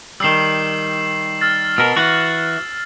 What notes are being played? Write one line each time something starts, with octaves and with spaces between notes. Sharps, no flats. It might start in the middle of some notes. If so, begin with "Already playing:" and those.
D#3 G3 E6 C7 E7
E6 F6 A6
B2 A#4 E6
E3 F#4